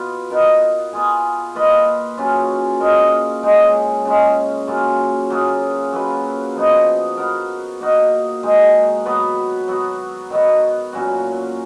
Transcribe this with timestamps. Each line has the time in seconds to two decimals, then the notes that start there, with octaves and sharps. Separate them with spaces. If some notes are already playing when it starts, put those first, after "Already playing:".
Already playing: B2 B3 F4 B4
0.30 B3 D#4 A#4
0.93 B3 F4 G#4
1.55 A#3 F4 B4 D#5
2.17 C#3 F#3 C#4 F4
2.80 A#3 F4 A#4 D#5
3.43 C#3 G#3 D#4
4.05 C#3 G#3 C#4
4.67 C#3 F#3 A#3 F4
5.30 F#3 A#3 F4 G#4
5.92 F#3 A#3 F4 B4
6.55 F3 B3 D#4 F#4
7.17 B3 F#4 A#4
7.80 A#3 D#4 F#4
8.43 D#3 G#3 D#4
9.05 F#3 B3 F#4 B4
9.68 F#3 B3 F#4
10.30 D#3 F#3 B3
10.93 A#2 F#3 C#4 F#4